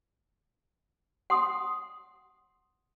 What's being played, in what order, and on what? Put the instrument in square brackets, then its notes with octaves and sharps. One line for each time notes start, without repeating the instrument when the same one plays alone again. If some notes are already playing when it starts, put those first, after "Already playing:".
[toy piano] F#5 C6 D#6